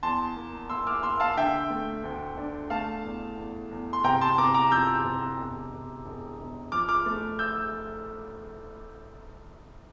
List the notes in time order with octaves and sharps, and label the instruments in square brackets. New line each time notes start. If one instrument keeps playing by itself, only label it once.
[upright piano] E2 A5 C6
A#3
A#3 C6 E6
D6 F6
A#3 C6 E6
F5 A5
D3 E5 G5
A3
D2
D4
A3 F5 A5
E2
E2
E2
C6
C3 G5 A#5
A5 C6
C3 A#5 D6
A#5 D6
F2 E6 G6
C3
E1
E1
E1
E1
F3 D6 F6
D6 F6
A3
E6 G6